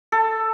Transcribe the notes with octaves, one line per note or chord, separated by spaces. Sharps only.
A4